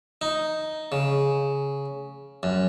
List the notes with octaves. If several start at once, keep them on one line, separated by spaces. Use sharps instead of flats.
D#4
C#3
F#2